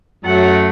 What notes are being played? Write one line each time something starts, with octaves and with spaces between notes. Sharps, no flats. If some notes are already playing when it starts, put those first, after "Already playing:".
F#2 F#3 A3 F#5